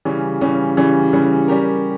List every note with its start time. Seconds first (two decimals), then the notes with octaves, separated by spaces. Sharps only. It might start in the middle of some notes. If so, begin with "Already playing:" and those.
0.05 C#3 E3 G3 C#4
0.41 C#3 E3 G3 C#4
0.77 C#3 E3 G3 C#4
1.13 C#3 E3 G3 C#4
1.48 G3 C#4 G4 A#4